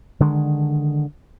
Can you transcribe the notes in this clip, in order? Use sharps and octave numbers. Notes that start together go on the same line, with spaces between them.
D3 D#3 G#3